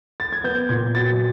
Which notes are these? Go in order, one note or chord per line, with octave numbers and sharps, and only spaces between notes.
A6
G#6
B3 G6
A#2 G#6
F#3 A6